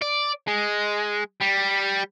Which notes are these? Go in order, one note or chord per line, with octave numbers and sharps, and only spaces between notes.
D5
G#3
G3